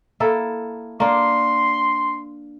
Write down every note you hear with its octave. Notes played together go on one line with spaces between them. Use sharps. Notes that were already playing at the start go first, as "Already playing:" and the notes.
A#3 E4 A4
A#3 D4 C6